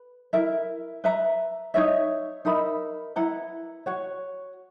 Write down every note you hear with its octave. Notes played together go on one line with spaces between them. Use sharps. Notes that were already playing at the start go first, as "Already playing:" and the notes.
Already playing: B4
E4 A#4 E5
B4 E5 A#5
D#4 F#4 C#5 E5
D#4 A#4 E5 B5
E4 B4 F#5 A#5
F#4 C#5 F#5